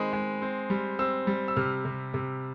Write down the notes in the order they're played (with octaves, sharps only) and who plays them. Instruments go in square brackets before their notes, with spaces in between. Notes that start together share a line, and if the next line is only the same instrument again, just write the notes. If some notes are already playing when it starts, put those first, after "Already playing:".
Already playing: [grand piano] D#3 G#3 C4 B5 D#6
G#3
C4
G3
C4 E6
G3
E6
C3 F6
C3
C3